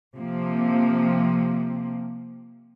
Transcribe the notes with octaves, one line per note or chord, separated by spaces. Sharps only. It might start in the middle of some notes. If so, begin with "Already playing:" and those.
C3 F3 A#3